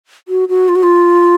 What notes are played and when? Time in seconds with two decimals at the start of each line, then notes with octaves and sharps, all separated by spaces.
0.28 F#4
0.49 F#4
0.69 F4
0.76 F#4
0.83 F4